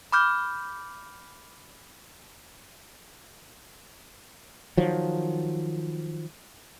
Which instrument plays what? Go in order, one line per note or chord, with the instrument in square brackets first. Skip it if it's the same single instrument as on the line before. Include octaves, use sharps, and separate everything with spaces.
[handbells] B5 D6 F6 G6
[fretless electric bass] D#3 F3 F#3